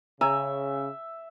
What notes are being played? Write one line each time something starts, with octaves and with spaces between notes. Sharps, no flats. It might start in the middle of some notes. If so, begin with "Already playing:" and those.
C#3 C#5 E5 G#5 A#5